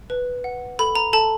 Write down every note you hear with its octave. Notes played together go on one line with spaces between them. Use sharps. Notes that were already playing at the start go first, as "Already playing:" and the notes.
B4
F#5
A4 B5
A#5
A4 A5